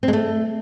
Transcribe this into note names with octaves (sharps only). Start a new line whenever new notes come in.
C4
G#3
A3